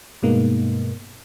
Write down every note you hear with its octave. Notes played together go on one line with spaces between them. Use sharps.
G2 B2 G#3 A#3 B3 D#4